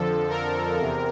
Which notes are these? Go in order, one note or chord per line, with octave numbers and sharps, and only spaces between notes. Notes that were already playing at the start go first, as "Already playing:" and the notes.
Already playing: F2 D3 F3 A4
A#4
E2 C3